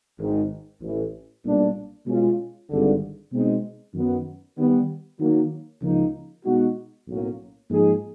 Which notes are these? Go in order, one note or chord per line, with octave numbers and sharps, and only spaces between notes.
G#1 G#2 D#3
A1 A2 E3
B1 A#2 G3 A#3 D4
B2 G#3 C#4 F4
G#1 G2 D3
B2 G#3 C4 D#4
F#2 D#3 F#3 B3
D#3 G3 B3
D#3 F#3 A#3
C#2 C#3 F3 A#3 D#4
B2 G#3 B3 D#4 F#4
B1 A2 F#3 A#3 C#4
G#2 F3 A#3 D#4 G#4